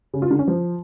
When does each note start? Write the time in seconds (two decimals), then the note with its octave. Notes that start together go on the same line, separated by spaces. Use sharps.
0.14 C#3
0.22 F4
0.31 D3
0.39 C#4
0.47 F3